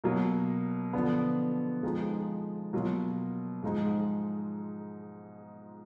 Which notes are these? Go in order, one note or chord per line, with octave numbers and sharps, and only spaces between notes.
B2 F#3 A#3
D3 F3 B3 D4
F2 F3 G#3 D#4
B2 F#3 A#3 F4
G#2 F3 G#3 D#4